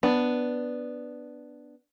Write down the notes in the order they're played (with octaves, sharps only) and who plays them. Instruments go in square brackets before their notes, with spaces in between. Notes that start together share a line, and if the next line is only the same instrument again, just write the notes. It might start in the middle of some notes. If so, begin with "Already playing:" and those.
[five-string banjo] B3 D4